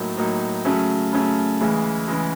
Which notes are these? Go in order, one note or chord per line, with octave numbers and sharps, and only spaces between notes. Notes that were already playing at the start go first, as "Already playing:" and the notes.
Already playing: A2 F#3 A#3 D#4
A2 F#3 A#3 D#4
C#3 F#3 A3 C#4
C#3 F#3 A3 C#4
D2 C#3 E3 G#3
C#3 E3 G#3